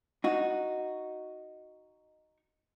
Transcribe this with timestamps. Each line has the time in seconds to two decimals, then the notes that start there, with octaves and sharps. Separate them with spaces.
0.24 D#4 F#4